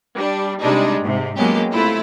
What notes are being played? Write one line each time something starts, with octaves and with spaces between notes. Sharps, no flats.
G3 D4
C3 G3 G#3 D4 D#4
G#2 C3
F#3 G#3 A#3 B3 C#4 G4
C3 A3 E4 F4